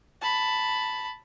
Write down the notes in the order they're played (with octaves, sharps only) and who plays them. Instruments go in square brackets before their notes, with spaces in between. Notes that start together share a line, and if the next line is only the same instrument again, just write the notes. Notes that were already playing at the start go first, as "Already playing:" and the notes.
[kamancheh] A5 B5